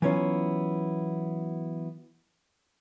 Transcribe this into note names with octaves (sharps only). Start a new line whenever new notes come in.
E3 F#3 B3 C#4 E4 F4